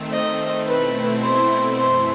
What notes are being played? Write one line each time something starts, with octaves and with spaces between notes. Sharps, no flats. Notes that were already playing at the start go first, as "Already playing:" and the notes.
Already playing: D#3 A3 C4
D#5
B2 A3 C4 E4 B4
C5
F#2 E3 A3 E4 C5